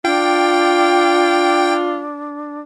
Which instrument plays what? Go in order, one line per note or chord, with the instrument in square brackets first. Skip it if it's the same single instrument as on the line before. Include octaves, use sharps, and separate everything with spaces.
[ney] D4 [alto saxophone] F4 [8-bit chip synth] G5